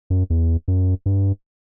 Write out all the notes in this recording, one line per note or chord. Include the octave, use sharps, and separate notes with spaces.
F#2
E2
F#2
G2